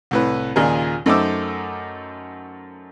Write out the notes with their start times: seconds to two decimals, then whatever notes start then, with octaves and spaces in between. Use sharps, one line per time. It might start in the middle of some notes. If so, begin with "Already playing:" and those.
0.11 C2 A2 B4
0.56 D#2 A#2 C#3 F4 G#4 A#4
1.06 F#2 A3 D#4 C5 D6 E6